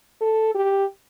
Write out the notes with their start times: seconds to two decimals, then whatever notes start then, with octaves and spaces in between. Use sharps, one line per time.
0.21 A4
0.55 G4